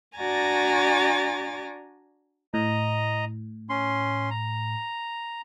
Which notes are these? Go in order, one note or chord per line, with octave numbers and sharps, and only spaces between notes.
D4 F#4 D5 G#5 A#5 A6
A2 D#5 A#5
C#4 C6
A#5